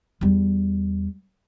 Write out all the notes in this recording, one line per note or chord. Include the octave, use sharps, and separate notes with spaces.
E2 G3